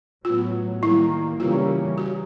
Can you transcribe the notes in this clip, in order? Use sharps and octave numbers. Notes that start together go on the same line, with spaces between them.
A2 F#3 B3 F4
D#3 G3 A#3 E4
C#3 E3 G3 A#3 C#4 F4
F#4